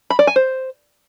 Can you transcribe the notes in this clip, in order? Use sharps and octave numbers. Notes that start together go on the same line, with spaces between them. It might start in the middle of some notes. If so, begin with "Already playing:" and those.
B5
D5
G#5
C5